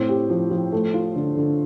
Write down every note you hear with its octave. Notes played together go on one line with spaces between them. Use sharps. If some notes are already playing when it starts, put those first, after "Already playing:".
Already playing: A2 C4
G4
F3
F3
A3
F4
D3
D3